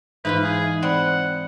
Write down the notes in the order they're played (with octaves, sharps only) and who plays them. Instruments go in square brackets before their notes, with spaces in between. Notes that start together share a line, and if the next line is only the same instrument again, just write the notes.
[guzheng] G#2 E4 F4 [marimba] E3 [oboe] B4
[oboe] G#4
[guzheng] C4 [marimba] D5 B5 [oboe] F#5